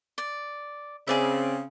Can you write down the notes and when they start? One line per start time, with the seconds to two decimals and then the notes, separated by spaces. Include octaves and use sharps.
0.18 D5
1.07 C#3 C4 G#4 D5 E5